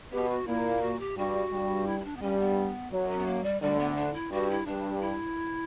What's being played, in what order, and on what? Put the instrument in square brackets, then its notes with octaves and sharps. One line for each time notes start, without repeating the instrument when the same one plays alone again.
[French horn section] B2 B3 [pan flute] G4
[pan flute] F#4
[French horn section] A#2 A#3 [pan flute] E4
[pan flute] F#4
G4
[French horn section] G2 G3 [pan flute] F#4
[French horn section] G2 G3
[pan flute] E4
E4
D4
B3
[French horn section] G2 G3 [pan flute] C#4
[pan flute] B3
[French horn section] F#2 F#3
[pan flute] C#4
B3
A#3
G3
[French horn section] D2 D3 [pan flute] G3
[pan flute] B3
D4
E4
[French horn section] G2 [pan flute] F#4
[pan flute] E4
[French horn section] G2 [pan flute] D4
[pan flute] E4